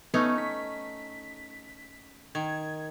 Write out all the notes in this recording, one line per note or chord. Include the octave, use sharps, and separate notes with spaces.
A3 B3 C#4 D#4
B6
D#3 G#6